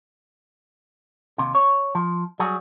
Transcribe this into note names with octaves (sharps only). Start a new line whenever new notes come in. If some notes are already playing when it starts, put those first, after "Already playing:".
D#2 C3
C#5
F3
F#3 G3 F#4 G#4